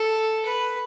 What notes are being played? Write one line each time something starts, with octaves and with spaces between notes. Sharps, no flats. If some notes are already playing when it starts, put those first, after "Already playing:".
Already playing: A4
B4